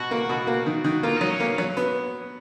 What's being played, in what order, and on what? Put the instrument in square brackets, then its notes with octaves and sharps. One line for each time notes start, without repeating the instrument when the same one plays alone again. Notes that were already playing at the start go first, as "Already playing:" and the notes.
Already playing: [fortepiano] B2 [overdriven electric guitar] F#4
[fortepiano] A#3
B2
A#3
D#3
D#3
[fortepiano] A#3 [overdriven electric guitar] F4
[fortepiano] F#3 [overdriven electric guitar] D#4
[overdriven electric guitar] C#4
[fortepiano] A#3
F#3
B3